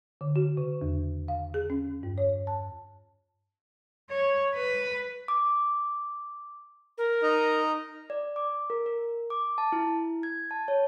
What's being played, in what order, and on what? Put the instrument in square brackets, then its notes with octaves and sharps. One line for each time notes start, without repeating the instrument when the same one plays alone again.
[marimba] D3
F#4
C#3
E2
F5
G#4
C#4
G2
C#5
A5
[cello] C#5
B4
[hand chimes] D6
[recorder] A#4
[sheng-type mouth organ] D#4 D#5 A#5
[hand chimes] D5
D6
A#4
A#4
D6
A5
E4
G#6
A5
C#5